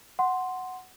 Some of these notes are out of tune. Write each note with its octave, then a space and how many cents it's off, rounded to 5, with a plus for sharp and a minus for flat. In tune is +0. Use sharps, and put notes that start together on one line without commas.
F#5 +0 C6 +0